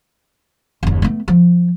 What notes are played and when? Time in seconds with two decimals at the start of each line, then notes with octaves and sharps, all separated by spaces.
0.83 F#1 D#2
1.02 A3 B3
1.28 F3